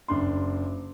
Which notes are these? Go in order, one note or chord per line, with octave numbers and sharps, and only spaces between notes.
F#1 D4 C6